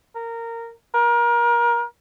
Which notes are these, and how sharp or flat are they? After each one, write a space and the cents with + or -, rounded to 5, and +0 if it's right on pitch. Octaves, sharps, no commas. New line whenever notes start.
A#4 -15
A#4 +30